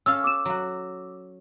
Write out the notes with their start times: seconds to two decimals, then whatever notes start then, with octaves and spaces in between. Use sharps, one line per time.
0.06 C#4 A4 F5 E6
0.24 D6 E6 E7
0.45 F#3 F#4